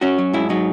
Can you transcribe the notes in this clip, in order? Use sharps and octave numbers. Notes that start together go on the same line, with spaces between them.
C#4 F#4
F#3
G#2 E4
F#3 D#4